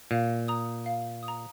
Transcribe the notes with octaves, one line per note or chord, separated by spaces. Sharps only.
A#2 F5
A#5 D#6
F5
D#6
A#5